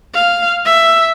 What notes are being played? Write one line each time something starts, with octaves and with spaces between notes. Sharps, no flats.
F5
E5